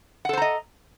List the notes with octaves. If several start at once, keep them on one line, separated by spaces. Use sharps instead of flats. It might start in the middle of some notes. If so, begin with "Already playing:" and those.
A4 C5 D#5 F#5 A#5